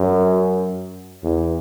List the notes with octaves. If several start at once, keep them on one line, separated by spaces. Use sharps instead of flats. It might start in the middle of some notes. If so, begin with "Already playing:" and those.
Already playing: F#2
E2